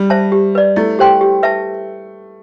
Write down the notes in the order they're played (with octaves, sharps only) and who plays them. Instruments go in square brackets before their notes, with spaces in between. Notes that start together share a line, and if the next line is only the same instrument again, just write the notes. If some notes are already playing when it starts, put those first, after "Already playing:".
Already playing: [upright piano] G3
[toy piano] C5 E5 A5
G4
B4 D5
[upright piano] A3 [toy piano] E4
[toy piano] G4 C5 G5 C6
G4
B4 E5 A5